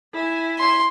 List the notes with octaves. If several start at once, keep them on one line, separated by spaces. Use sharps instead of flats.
E4 G#5
C6